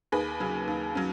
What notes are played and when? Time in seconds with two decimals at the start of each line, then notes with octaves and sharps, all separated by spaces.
0.12 D#2 G#4 B4
0.40 C#3 F#3 C#4
0.67 D#2
0.95 F#3 C#4